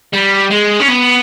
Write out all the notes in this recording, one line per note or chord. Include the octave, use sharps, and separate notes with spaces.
G3
G#3
C#4
B3